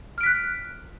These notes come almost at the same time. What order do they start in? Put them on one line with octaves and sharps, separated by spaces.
F6 D7 B6 F#6